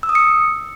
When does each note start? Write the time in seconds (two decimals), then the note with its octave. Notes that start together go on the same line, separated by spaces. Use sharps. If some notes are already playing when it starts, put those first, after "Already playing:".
0.03 E6
0.09 D#6
0.15 C#7